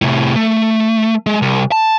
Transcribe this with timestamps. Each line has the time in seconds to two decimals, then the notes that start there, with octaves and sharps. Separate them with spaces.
0.02 A2 C3
0.36 A3
1.26 G#3
1.42 C2
1.72 A5